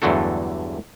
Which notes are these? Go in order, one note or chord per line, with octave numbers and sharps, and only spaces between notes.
E2 G2 D3 F#3 A3 A4